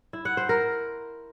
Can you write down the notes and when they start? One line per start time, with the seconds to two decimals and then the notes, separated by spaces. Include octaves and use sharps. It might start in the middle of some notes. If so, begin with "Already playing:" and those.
0.13 E4
0.25 F#5
0.37 C5
0.49 A#4